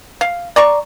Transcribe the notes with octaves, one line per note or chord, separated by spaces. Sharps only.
F5
D5 A#5 C#6